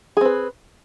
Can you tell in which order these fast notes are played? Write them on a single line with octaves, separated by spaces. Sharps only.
G#4 C4 B4